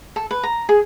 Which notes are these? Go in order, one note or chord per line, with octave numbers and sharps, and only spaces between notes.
A4
B4
A#5
G#4